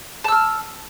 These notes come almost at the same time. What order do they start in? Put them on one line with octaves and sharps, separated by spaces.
A5 E6 F6